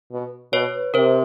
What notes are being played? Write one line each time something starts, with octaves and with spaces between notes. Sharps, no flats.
B2
B2 B4 C#5
C3 A#4 C5